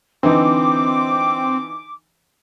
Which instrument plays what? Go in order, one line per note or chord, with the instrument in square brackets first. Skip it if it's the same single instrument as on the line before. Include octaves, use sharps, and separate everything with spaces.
[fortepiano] D3 E3 D#4 [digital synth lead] C4 [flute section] D6